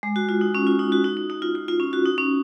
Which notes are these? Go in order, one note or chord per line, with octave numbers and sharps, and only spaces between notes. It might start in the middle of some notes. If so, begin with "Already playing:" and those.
G#3
F#4
F4
D#4
C#4
F4
D#4
F#4
D#4
D#4
D#4
F4
F4
F4
C#4
F#4
D#4
C#4